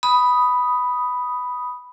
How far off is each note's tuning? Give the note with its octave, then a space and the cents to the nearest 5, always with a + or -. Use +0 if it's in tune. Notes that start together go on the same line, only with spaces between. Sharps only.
B5 +0 D#6 +0